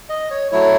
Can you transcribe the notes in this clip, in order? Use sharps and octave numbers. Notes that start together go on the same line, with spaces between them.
D#5
C#5
F#3 A3 E4 C#5